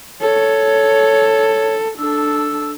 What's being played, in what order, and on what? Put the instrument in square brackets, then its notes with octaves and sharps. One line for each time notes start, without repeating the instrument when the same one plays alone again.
[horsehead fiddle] A4 [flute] C#5
[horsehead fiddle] D4 A4 [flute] E6